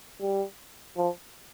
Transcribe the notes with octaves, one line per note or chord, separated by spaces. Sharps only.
G3
F3